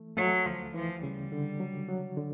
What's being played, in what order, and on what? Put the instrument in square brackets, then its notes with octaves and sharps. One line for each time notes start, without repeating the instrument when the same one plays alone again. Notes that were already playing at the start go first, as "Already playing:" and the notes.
Already playing: [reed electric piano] E3 A3
[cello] F#3 [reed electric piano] A3
[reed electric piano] D2 [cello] F3
[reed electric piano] E3 [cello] F3
[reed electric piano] C#3 [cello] G3
[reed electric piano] D3
F#3
F#3
D3